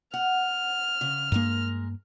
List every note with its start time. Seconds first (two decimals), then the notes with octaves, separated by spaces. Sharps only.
0.14 F#5 F6
1.01 C#3
1.32 G2 G#3 A#3 A#4